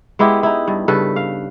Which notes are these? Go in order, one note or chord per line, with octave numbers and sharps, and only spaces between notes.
G#3 B3 E4 G4
D#4 E4
G2
G2 C#3 A4 B4
F5